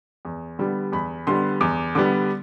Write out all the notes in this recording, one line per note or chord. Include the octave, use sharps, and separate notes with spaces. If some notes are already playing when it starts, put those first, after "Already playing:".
E2
D3 G3 B3
E2 B5
D3 G3 B3 C6
E2 D6
D3 G3 B3 D6